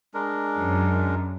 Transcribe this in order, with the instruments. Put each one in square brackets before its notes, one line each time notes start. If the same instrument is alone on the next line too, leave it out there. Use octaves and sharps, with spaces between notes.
[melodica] G#3 D4 A#4
[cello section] F#2